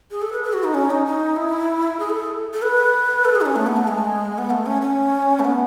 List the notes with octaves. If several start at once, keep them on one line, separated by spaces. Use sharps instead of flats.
G#4
A4
B4
A4
F#4
D#4
C#4
D#4
D#4
E4
G#4
A4
A4
B4
A4
G#4
D#4
C#4
A3
B3
A3
G#3
B3
A3
C#4
C#4
A3
B3